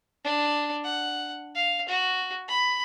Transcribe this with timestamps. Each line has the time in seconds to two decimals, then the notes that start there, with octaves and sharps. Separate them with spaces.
0.24 D4
0.84 F#5
1.55 F5
1.89 F#4
2.48 B5